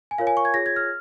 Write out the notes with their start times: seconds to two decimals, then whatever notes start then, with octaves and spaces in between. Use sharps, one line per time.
0.11 G#5
0.18 F4 A#4 C#5 F5
0.27 G#5
0.37 C#6
0.45 G#6
0.54 F4 G#4 C#5 A#6
0.66 G#6
0.76 F6